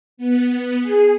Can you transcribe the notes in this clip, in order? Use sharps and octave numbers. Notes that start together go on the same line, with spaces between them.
B3
G#4